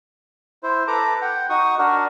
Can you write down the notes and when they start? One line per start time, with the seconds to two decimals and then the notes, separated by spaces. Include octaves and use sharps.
0.63 E4 C5
0.87 A4 B4 A#5 D6
1.21 F#5 G5
1.50 D#4 F#4 C#6 D#6
1.78 D4 F#4 A#4